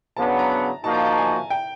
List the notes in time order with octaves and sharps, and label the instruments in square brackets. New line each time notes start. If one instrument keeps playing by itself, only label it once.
[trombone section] C#3 F#3 B3 D4 [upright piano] A5
[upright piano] A#5
[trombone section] F3 A#3 D#4 F#4 [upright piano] A5
[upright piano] A#5
A5
G#5
G5